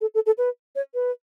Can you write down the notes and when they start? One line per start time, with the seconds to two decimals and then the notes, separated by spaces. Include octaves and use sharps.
0.01 A4
0.14 A4
0.26 A4
0.38 B4
0.76 C#5
0.94 B4